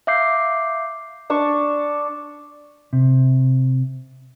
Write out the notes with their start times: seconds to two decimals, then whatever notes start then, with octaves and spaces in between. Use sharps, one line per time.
0.07 E5 F5 D6 G6 C7
1.30 D4 A5 C#6
2.93 C3